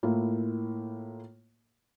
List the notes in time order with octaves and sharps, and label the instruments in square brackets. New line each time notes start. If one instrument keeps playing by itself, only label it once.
[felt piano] A2 A#3 E4 F4